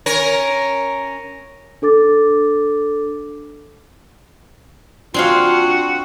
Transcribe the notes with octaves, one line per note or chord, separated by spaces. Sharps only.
C#4 A#4
D4 A4 D6 A6
C4 D4 F4 F#4 G#4 F5